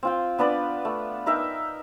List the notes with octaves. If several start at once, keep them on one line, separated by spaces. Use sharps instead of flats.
C4 F4 G5
B3 D4 B4 D5
A3
D#4 A#4 E5 G5